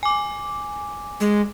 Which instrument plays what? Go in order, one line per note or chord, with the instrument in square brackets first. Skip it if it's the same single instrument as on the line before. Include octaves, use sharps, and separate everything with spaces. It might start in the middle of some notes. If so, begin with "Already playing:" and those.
[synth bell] G#5 D6
[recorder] G#3